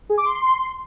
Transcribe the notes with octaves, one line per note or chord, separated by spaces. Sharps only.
G#4
D6
C6